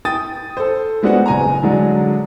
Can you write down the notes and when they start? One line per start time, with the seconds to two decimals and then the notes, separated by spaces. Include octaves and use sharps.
0.05 G5 D#6 A6
0.57 A4 C5
1.03 G#3 B3 D4 F#4 C5 F#5
1.26 F#1 G#5 A#5
1.63 D3 F#3 G#3 D5